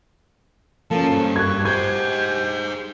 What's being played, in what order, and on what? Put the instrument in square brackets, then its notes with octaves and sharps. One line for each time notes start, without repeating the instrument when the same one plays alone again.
[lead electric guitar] F3 [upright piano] A#3 C#4 [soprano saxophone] A4
[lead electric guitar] G2 [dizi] C5
[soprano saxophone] G4 [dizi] C#6 [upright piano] F#6 G#6
[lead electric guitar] G#4 C5 [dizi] G6 [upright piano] G#6